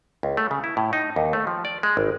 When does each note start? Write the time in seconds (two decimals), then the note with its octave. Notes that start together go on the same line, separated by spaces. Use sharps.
0.23 C#2
0.37 A3
0.51 C#3
0.64 E4
0.77 A2
0.93 D#4
1.16 D#2
1.33 A3
1.47 F3
1.65 D5
1.83 G#3
1.97 G#1